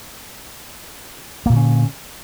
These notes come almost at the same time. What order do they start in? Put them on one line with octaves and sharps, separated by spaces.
A#3 A#2 D3 C#4